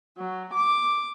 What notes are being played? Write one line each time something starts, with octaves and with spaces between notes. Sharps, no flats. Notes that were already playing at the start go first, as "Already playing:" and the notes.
F#3
D6